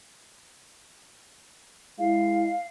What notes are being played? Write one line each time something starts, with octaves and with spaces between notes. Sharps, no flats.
G#3 E4 F5